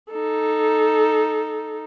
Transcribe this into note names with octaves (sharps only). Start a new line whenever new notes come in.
D#4 A4